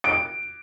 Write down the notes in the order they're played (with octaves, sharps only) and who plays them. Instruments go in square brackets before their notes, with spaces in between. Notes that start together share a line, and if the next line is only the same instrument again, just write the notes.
[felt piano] D7